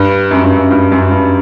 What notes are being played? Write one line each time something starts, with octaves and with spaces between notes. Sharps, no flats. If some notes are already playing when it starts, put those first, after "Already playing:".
Already playing: G2
F#2
G2
F#2
G2
F#2
G2